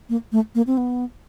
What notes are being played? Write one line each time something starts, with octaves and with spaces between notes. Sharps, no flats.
A#3
A3
A#3
C4
B3